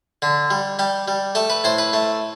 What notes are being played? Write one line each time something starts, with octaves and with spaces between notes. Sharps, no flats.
D3
G3
G3 G4
G3
A3 A4
B4
A2 C5
B4
A3